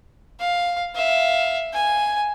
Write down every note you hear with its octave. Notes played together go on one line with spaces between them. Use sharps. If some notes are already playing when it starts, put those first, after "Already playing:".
F5
E5 F5
G#5